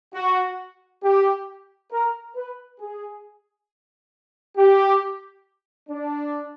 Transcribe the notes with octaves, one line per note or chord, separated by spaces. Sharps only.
F#4
G4
A#4
B4
G#4
G4
D4